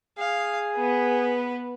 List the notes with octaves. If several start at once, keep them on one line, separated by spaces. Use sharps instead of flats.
G#4 F5
B3 B4